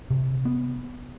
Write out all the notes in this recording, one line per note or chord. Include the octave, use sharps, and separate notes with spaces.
C3
B3